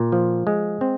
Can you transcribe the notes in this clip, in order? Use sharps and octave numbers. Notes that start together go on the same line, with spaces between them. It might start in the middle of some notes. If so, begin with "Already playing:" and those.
Already playing: A#2
F3
G#3
C4